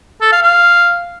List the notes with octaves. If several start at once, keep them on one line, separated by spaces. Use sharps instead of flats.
A4
F5
F5